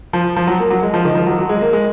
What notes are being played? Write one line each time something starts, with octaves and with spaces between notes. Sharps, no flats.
F3
F3
F#3
A#3
F#3
G#3
F3
D#3
F3
F#3
F#3
G#3
A#3
G#3